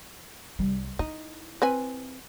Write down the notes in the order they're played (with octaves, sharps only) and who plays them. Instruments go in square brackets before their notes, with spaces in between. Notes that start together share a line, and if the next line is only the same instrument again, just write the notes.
[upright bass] C2 G3
[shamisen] D#4 [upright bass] E4
[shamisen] C4 B4 G#5